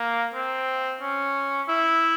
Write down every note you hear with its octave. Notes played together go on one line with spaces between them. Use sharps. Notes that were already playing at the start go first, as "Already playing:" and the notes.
Already playing: A#3
C4
C#4
E4